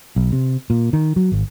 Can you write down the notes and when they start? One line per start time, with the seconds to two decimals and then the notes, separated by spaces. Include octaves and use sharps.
0.16 B1
0.32 C3
0.70 A#2
0.93 D#3
1.16 F#3
1.32 G#1